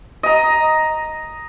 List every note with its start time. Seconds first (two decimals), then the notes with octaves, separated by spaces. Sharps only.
0.23 D#5 A#5